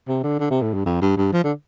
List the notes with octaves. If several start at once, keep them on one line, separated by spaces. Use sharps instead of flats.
C3
D3
D3
C3
A2
G2
F2
G2
G2
F3
D3